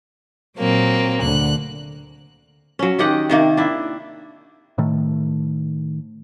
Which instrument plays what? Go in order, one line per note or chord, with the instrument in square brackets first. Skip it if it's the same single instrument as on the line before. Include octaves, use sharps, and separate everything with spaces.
[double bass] A#2 [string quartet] F#3 A#3 C4
[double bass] D2 D3 [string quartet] F#6
[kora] F#3 C#4
D#3 G4 D#5 F#5
C3 D#3 A#3
D4 E4
[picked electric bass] A2 D#3 A3